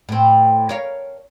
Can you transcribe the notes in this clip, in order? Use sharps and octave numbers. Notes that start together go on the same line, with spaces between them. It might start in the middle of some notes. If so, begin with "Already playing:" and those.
A2 C4
A#4 C#5 F5